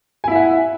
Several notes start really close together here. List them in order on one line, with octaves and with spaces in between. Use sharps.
G#5 E4 E5 F#5